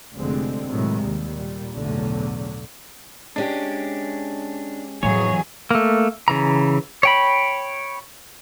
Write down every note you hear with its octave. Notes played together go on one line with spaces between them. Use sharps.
F1 D3 G#3 C4
A2 C3 D#3 F#3 G#3
D#2 G3
A#2 G3
B1 E2 A2 D3 F#3
G#3 C#4 D4 G4
F2 A2 E3 F#3 B3 G#4 C#5
A3 A#3
C#3 E3 A#5
C#5 G5 B5